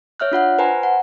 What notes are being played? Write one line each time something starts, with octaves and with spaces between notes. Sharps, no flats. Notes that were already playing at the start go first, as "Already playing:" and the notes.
C#5 E5 F6 F#6
D4 F4 F#5 F#6
B4 C5 G5 G#5 A#5 C6
F#5